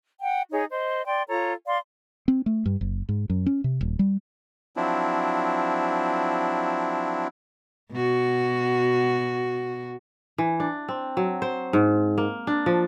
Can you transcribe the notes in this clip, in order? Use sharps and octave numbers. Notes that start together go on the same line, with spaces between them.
F#5 G5
D#4 G#4 C#5
C5 D#5
D5 G5 C6
F4 A4 C#5 A#5
D5 F5 C6
C4
A3
G2
F#1
G#2
F#2
C#4
C3
D#1
G3
F3 F#3 C4 D4 E4
B2 F#4
E3
D4
C4
F#3
C5
G#2
A#3
D4
F3